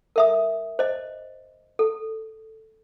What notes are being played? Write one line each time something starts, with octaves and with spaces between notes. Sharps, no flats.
A#4 E5 D#6
C5 D#5
A4